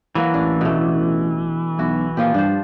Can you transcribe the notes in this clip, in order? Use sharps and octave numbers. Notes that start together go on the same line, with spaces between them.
E3 F#3 A#3 F#4
A1 D4
B2 A3
B1 E4 F#4
A#2 F3 F4 G4
G2 D4 C5